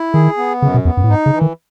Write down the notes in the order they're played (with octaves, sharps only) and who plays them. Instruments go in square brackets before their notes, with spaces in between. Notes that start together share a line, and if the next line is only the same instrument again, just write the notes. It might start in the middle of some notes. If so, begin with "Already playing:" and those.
Already playing: [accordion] E4
[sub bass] D#3 [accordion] G#4
[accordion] B3
[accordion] F#2 [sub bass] C#3
[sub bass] B2
[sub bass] E2 [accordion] B3
[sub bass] F#2
A2
[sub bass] G#2 [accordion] D#4
[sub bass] C#3
[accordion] E3
[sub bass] D#3